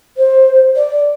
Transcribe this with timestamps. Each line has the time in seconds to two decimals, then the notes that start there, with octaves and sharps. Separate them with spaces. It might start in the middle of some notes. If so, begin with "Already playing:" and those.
0.17 C5
0.76 D5